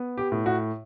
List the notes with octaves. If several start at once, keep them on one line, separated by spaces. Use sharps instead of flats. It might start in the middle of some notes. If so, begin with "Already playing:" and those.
Already playing: B3
G4
A2
F#4